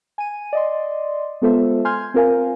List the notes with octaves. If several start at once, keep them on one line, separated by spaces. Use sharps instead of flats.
G#5 D#7
D5 D#5 C6
G#3 B3 F4 A4 C5 E5
G#5 C6 F6 G6 G#6
C4 F4 A#4 F5 G#5